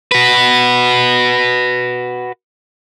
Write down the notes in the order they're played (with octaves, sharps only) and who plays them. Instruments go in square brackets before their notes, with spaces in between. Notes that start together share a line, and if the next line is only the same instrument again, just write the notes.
[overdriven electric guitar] F#4 B4